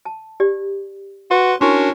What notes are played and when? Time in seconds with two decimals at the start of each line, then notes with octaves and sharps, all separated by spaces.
0.05 A5
0.40 G4 D5
1.31 F#4 B4 C6
1.61 C#4 D4 E4 F#4 A#4 C6